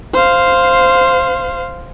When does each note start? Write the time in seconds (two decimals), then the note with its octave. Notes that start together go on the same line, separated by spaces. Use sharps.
0.14 C5 F5